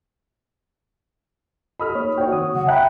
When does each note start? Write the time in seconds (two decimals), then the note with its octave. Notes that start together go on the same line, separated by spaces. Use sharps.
1.80 G4 A4 D#5 B5 D#6 F6
1.95 A#3 D#4 C#5
2.18 F#4 C#5 G5
2.32 D#3 C4 D#6
2.54 C#3 F#3 F#5
2.67 A#1 E5 G5 G#5 A#5 B5 F#6